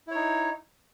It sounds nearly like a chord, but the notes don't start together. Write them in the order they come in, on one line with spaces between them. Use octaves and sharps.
E4 C#5 D#4